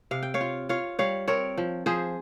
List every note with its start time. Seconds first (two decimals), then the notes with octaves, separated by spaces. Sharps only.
0.11 C3 F5
0.23 G5
0.34 C#5 F5
0.41 F4
0.69 F4 C#5 F5
0.99 G3 C#5 F5
1.28 C4 A#4 C#5
1.58 F3
1.86 F3 G#4 C5